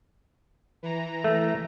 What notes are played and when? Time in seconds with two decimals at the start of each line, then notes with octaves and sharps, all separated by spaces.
0.83 E3 A#5
1.24 A3